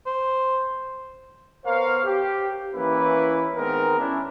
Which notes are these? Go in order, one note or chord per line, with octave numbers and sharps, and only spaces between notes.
C5
B3 A#4 C5 C#5 F5
G4
E3 A#3 C#4 E4 B4
D#3 G#3 B3 C4 D#4 A#4
C#4 D4 E4